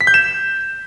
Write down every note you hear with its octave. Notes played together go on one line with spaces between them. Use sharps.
B6
G6
E7